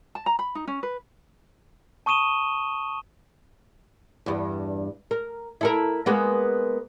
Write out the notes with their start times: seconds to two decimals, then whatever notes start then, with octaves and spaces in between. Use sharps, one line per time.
0.15 A5
0.26 A#5
0.39 B5
0.55 D#4
0.67 C#4
0.83 B4
2.06 A5 C#6 D#6 D#7 E7 G7
4.26 E2 G2
5.11 A#4
5.61 E4 A4 A#4
6.06 G#3 A#3 B3